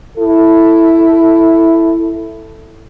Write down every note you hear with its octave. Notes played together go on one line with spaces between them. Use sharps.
E4 A4